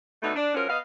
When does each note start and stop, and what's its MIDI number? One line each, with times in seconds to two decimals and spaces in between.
0.23 0.35 47
0.23 0.35 50
0.23 0.35 57
0.23 0.35 63
0.36 0.54 62
0.55 0.67 53
0.55 0.67 54
0.55 0.67 61
0.55 0.67 70
0.69 0.77 59
0.69 0.77 75
0.69 0.77 77